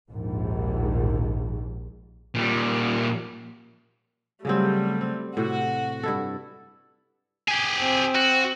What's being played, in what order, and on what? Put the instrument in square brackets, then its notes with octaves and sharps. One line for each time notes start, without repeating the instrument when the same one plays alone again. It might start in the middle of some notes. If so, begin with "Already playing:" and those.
[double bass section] A#1 D#2 G#2
[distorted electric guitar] A#2 G3
[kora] C#3 F#3 C4 [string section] G3 A3
[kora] C4
[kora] A2 C3 [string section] F#4
[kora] G2 E4 A4
[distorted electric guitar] G4 G#4
[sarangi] C4
[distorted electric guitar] F#4